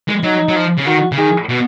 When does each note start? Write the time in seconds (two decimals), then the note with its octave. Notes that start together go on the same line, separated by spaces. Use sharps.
0.08 G#3
0.23 F#3 D#4
0.48 F#3
0.56 F3
0.78 C#3
0.86 D#3 F#4
1.12 C#3
1.18 D#3 G#4
1.49 B2